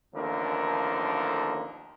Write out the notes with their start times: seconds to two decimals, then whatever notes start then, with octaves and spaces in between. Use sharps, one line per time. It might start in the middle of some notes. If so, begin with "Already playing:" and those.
0.14 A1 D#2 D3 F3 A#4